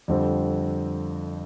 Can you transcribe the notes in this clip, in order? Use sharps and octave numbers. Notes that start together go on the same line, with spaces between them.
F2 D3 G3 C4